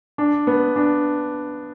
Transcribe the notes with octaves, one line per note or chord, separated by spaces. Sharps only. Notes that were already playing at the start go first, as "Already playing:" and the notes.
D4
B3
D4